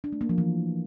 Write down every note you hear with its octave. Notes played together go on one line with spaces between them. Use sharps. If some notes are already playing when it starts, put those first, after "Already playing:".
D4
A3
A#3
F3
E3